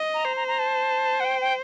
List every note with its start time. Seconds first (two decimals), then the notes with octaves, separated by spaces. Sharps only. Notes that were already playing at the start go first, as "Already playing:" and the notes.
Already playing: D#5
0.14 A#5
0.26 C5
0.37 A#5
0.48 A#5
0.59 A5
1.20 F#5
1.25 G5
1.41 G5